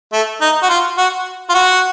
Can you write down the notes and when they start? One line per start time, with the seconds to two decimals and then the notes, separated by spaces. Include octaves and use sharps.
0.13 A3
0.41 D#4
0.63 F#4
0.69 F4
0.98 F#4
1.49 F4
1.54 F#4